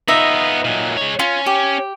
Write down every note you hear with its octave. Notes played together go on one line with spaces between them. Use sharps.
B3 D#4 F4 D#5 E5
A#2 F#3
G#3 C#5
C#4 F4
G4